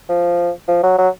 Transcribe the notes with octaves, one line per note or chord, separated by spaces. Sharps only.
F3
F3
F#3
F#3